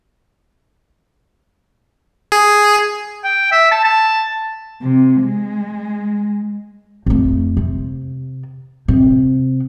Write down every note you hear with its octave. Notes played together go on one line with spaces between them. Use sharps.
G#4
G5
E5
A5
A5
C3
G#3
F2 A3
C3
C3